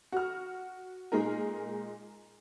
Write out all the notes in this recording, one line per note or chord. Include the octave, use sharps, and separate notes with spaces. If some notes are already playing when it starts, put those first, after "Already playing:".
F#4 F6
A#2 G#3 D#4 A#4